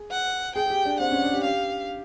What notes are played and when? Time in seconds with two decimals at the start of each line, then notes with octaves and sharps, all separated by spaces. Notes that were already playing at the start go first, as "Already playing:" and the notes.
Already playing: G#4
0.11 F#5
0.55 G#4 G5
0.66 G#4
0.70 G4
0.85 D4
1.00 C4 F#5
1.11 C#4
1.22 D4
1.34 G4
1.44 G4 F5